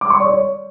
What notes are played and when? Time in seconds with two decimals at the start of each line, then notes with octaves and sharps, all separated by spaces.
0.01 D6
0.10 C#6
0.20 D5
0.29 C#5